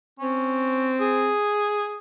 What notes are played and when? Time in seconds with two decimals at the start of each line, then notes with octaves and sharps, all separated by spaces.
0.19 C4 C#4
1.00 G#4